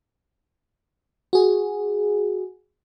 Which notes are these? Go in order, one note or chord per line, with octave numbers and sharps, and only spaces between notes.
F#4 G#4